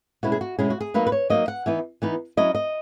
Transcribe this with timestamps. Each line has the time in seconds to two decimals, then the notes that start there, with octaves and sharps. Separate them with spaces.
0.23 B2 G#3 C#4 E4 F#4
0.32 G#4
0.41 F#4
0.59 B2 G#3 C#4 E4 G#4
0.70 F#4
0.80 G#4
0.94 F#3 A#3 D#4 B4
1.07 B4
1.12 C#5
1.30 F#3 A#3 D#4 D#5
1.48 F#5
1.66 E3 B3 D#4
2.02 E3 B3 D#4
2.37 F#3 C#4 E4 D#5
2.55 D#5